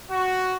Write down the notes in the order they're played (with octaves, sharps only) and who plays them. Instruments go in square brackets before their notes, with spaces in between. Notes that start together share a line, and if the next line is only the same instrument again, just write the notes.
[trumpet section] F#4